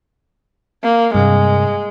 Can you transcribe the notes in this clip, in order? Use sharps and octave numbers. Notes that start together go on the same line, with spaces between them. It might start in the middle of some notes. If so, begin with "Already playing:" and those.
A#3
G2 C3 G#3